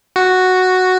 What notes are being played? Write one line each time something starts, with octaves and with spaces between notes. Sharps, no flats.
F#4